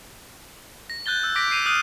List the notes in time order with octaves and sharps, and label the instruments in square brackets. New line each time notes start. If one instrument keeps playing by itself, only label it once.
[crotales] A#6
F#6 G6 A6 G7
E6
D6 F#6 G6 A#6 B6 D7
C7 D#7 F7
D#6 F6 F#6 D#7